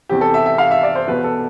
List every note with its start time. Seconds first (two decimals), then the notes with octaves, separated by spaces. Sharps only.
0.09 E2 C3 E3 G4
0.21 A4
0.34 E5
0.46 E5
0.58 F5
0.71 E5
0.83 D5
0.95 C5
1.08 E2 B2 B4
1.24 A4